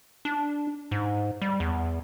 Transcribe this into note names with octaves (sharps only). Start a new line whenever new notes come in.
D4
G#2
G3
E2